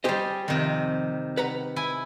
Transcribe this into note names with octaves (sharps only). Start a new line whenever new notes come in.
G3 G4 G#4 C5 D#5
F2 C3 D#3
B4 F#5 A#5
E4 G#5